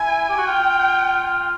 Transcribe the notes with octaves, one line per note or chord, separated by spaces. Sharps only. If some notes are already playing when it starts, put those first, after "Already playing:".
Already playing: E4 G#5
G4
F#4
F4 G5